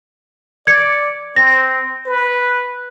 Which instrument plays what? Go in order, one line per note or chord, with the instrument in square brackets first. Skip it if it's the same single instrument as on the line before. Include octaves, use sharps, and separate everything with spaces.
[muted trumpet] D5 [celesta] G#6 C#7
[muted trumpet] C4 [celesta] A#6
[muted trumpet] B4